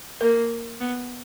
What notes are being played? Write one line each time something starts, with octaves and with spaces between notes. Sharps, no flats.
A#3 A#4
B3